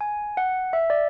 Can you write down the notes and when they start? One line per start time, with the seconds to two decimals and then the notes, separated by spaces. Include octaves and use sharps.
0.01 G#5
0.37 F#5
0.73 E5
0.90 D5